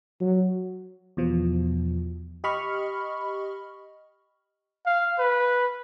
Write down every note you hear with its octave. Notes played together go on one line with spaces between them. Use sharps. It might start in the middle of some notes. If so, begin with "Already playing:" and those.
F#3
E2 B2 F3
G4 D#5 B5 C#6 F6
F5
B4